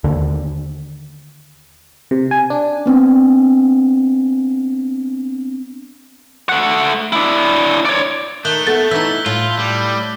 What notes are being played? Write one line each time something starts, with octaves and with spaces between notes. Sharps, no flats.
D#2 D3
C3
G#5
D4
B3 C4 D4
A3 F#5
D4 E4
C#5 D5
D#3 A3 F#6 G6 G7
B3 A4 A6
E3 D#4 E6 B6
A2 F4
G3